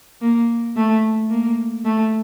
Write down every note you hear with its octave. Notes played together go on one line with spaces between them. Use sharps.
A#3
A3
A#3
A3